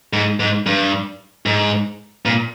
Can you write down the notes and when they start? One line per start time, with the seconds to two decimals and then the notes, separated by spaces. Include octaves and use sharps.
0.13 G#2
0.40 G#2
0.66 G2
1.46 G#2
2.26 A#2